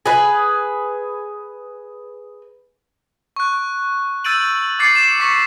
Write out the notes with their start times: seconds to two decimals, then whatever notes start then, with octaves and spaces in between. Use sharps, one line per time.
0.06 G#4 B4
3.36 C#6 F#6
4.24 E6 G6 A6 D7 D#7 F#7
4.79 D6 A6 C7 C#7
4.95 C7 E7
5.20 C#6 B6 C#7